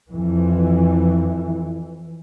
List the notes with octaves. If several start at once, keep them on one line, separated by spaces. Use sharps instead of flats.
F2 E3